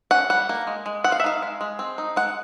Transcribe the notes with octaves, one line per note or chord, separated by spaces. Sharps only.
C#4 F#5
G3 F#5
A#3
G#3
G#3
C4 F#5
F5
E5
D#4 F5
G#3
G#3
C4
D#4
G#3 F#5